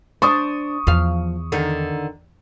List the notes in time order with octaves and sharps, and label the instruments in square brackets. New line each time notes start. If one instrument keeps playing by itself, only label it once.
[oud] D4 C5 [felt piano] C#6 D#6
[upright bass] E2 [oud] F3 F5
[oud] D3 D#3